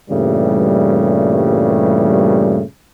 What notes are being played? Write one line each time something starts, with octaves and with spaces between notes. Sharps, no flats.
G2 A#2 C#3 E3 G3 A3